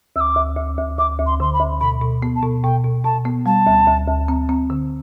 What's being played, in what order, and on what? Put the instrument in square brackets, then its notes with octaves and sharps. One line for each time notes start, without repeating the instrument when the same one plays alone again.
[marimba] D2 [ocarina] E6
[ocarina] D6
[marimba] D2
D2
D2
[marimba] D2 [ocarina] D6
[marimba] D2
[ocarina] C6
[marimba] D3 [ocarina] C6
[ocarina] B5
[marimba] D2
[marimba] B2 [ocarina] B5
[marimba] B2
B3
[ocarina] A5
[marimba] B2
[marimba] B2 [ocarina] G5
[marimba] B2
[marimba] B2 [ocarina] A5
[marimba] B3
[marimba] G3 [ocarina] A5
[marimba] D2
D2
D2
C4
C4
D3